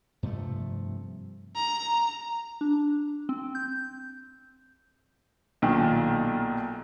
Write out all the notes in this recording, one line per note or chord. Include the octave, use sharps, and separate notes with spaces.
G2 C3 F3 A3
A#5
D4
C4
G6
B1 A#2 D#3